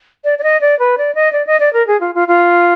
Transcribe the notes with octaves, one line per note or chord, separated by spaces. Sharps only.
D5
D5
D#5
D5
B4
D5
D#5
D5
D#5
D5
A#4
G#4
F4
F4
F4